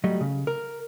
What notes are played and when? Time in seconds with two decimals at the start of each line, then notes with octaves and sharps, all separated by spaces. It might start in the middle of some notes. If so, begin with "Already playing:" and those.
0.04 F#3 G3 A3 D#5
0.21 C#3
0.47 A#4